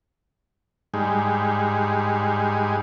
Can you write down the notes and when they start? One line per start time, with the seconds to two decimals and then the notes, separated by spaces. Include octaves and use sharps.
0.94 G#2 G3 G#3 D#4